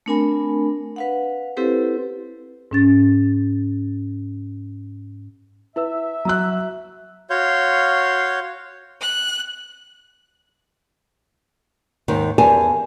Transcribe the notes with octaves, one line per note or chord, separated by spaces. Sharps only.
A3 C4 D4 A#4 G#5 B5
B4 F5 F#5
C4 E4 G4 A4 B4 C5
G#2 C#4 A6
E4 B4 E5 E6
F#3 A#5 E6 F#6
F#4 C#5 F5 C6 G6
F#6
D#2 G#2 D#3
E2 G4 A#4 G#5 A5